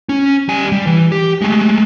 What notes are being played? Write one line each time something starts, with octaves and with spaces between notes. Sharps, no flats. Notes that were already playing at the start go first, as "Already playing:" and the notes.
C#4
G3 G#5
G3
E3
G4
G#3 A3